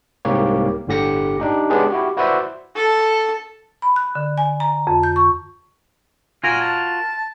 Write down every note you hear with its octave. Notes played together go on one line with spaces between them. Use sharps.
C2 G#2 A#3 G4 C#5
G1 A2 D3 G4 A#6 C#7
D4 D#4 G4
G#3 B3 C#4 D4 G4 G#4
E4 F#4 G4
E4 F#4 B4 C5 D5 E5
A4
B5
F#6
D3
G#5
A#5
F2
G6
C#6
F4 F#4 A#4 G#5
A5